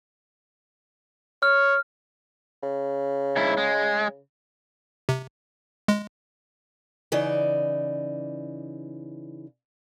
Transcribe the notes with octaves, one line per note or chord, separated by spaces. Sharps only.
C#5 F6
C#3
G#2 E4
G#3
C3
G#3
C#3 E3 D#4 D5